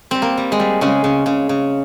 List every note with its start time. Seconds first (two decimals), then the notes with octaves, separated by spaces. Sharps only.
0.11 G3 C4
0.22 A#3
0.37 G3
0.52 G#3
0.59 G3
0.81 C#3 G#3
1.04 C#3
1.26 C#3
1.49 C#3